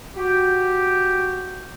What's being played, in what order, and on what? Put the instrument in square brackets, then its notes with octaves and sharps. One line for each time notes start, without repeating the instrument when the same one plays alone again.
[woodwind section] F#4 G4